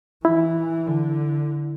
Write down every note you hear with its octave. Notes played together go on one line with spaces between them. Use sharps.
E3 E4
D3